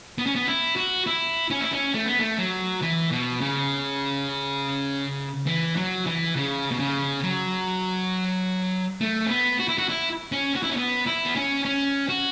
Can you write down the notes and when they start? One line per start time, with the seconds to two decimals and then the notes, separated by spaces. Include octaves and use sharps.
0.18 B3
0.26 C#4
0.35 B3
0.47 E4
0.76 F#4
1.07 E4
1.51 C#4
1.61 E4
1.72 C#4
1.94 A3
2.06 B3
2.19 A3
2.38 F#3
2.82 E3
3.12 B2
3.41 C#3
5.47 E3
5.76 F#3
6.06 E3
6.36 C#3
6.71 B2
6.79 C#3
7.24 F#3
9.01 A3
9.26 C#4
9.29 B3
9.59 F#4
9.68 E4
9.78 F#4
9.89 E4
10.32 C#4
10.56 F#4
10.63 E4
10.70 C#4
10.77 B3
11.06 E4
11.26 B3
11.36 C#4
11.65 C#4
12.09 F#4